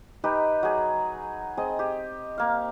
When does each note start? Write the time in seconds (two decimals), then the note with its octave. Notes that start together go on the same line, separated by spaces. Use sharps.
0.24 D#4 G4 B4
0.63 F#3 G#4
1.57 C4 G#4 D#5
1.79 G4
2.38 A#3 F5